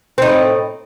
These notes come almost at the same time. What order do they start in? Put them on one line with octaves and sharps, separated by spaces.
C4 D#4 A2